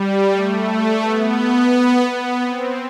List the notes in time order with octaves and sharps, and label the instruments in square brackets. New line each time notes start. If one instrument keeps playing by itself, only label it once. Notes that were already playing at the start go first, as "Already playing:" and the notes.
Already playing: [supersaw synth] G3
A3
B3
B3
C4